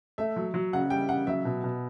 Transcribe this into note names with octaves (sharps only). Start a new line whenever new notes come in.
A3 E5
F#3
F#3
C#3 F#5
G3 G5
C#3 F#5
F#3 E5
B2
B2